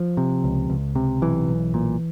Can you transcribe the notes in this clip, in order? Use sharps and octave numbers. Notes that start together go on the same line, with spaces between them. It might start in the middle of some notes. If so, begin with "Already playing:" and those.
Already playing: F3
C3
C#2
C#2
C3
B1 E3
B1
A#2